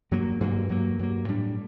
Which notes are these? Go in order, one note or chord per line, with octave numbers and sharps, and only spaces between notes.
G2 F#3 A#3
G2 F#3 A#3
G2 F#3 A#3
G2 F#3 A#3
A2 G3 D4